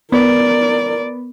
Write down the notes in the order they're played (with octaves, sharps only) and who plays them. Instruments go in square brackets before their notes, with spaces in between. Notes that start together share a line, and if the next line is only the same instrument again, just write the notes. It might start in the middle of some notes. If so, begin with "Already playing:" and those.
[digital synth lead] B3 [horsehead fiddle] A#4 D5